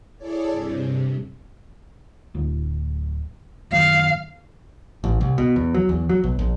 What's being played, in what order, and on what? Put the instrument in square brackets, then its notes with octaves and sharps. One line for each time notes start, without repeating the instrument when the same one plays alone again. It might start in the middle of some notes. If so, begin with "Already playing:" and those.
[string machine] E4 G#4 A4 C#5 D5
G2 C3
[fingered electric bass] D1
[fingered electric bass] F#2 D#3 [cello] F5
[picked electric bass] A1
C2
B2
E2
F#3
E2
F#3
B1
A#1